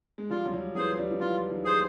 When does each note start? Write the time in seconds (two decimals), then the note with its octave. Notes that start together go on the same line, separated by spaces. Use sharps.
0.18 G#3
0.30 F3 G3 F4
0.46 F#3
0.53 F3 G3
0.75 E3 F#3 G#4 C5
0.97 F3 G3
1.11 F3
1.20 E3 F#3 F4
1.50 D#3 F3
1.64 G#4 C5